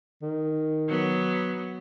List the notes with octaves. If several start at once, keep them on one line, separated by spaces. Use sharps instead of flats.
D#3
F#3 B3